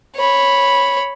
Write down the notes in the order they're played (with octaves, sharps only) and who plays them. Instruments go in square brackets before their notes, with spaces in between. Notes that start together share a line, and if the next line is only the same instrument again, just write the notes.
[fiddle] C#5 B5